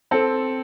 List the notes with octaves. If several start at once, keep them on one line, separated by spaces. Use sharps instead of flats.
C4 A4